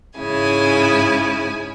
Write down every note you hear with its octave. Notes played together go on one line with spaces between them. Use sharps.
G#2 C#3 E4 G#5